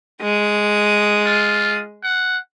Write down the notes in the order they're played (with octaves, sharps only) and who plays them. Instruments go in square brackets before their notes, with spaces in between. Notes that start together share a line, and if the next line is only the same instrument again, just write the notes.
[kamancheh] G#3 D#6
[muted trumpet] F4
F#5